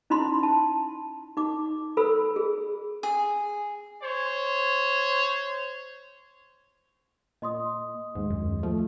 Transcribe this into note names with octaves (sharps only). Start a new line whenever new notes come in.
C#4 D#4 E4 B5 C6
A5
D#4 D6
A4 C5 B5 E6
G#4
G#4
C5 C#5
A#2 D#5 C6 D#6
D#2 G#2 G#3
F#2
F3 A3